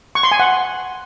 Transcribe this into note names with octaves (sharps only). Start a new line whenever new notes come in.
C#6
C6
G#5
F#5